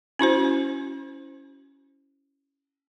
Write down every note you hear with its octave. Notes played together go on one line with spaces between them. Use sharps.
C#4 E4 F#4 C5